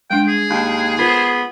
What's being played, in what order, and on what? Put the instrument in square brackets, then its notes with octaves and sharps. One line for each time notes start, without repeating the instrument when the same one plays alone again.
[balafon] G3 G#3 D4 [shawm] G5
[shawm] G#4
[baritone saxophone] D#2
[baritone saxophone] B3 [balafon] F4 A#4 C5